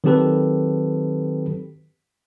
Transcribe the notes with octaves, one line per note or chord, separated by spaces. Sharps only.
D#3 F#3 C4 G4 A4 B4